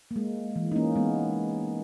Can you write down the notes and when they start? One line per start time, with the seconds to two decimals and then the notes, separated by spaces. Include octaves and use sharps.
0.11 A#3
0.16 G#3
0.56 E3
0.72 D#4
0.76 A#3 C#4
0.96 G#3 B3